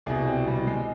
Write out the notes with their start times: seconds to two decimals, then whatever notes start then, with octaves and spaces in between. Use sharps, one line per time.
0.06 C2 B2 G#4
0.27 C4
0.47 G3
0.67 G#3